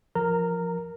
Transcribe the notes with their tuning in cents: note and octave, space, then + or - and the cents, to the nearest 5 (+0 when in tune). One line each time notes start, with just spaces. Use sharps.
F3 +0 A#4 +0 A#5 -20